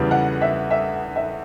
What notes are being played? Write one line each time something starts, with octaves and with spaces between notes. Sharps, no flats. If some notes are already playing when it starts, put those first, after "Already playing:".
Already playing: E2 C#3 G3 B3 E4
F#5
E5
E5
E5